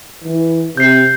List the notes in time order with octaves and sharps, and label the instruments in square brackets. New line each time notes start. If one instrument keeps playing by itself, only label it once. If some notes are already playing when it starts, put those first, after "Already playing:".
[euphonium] E3
[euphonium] C3 [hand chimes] G6 C7